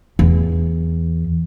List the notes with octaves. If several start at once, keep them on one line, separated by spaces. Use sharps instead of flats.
E2